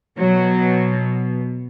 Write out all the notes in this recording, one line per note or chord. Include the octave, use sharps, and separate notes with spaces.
B2 F#3